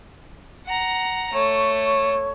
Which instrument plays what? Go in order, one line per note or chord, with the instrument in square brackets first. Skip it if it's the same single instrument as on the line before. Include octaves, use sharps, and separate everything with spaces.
[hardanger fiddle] F#5 A#5
[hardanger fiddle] A3 [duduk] C#5